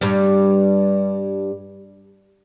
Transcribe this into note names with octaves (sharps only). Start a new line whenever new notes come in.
G2 G3